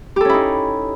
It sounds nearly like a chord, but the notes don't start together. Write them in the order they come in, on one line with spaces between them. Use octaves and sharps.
G4 A4 C#4 E4 D#4